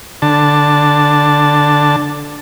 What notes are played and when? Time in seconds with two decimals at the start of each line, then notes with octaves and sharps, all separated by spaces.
0.22 D3 A5